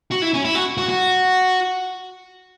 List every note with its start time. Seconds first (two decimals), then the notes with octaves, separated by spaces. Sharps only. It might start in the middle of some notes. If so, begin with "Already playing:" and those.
0.11 F#4
0.22 E4
0.34 C#4
0.44 E4
0.55 F#4
0.78 F#4
0.89 F#4